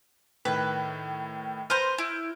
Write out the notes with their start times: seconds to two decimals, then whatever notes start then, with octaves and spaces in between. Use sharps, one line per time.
0.45 A2 D#3 B4
1.70 B4 C5 A#5 F6 G6
1.98 E4